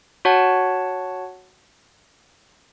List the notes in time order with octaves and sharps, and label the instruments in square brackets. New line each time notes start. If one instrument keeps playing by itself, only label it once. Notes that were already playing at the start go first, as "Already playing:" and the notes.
[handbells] F#4 C#5 F#5 A5